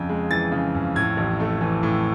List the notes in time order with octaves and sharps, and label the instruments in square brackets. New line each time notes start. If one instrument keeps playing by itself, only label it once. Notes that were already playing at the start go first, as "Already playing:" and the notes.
Already playing: [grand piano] F2 C#3
G#3
E3 A6
C#3
F2
A2 G#6
A1
A3
E3
A2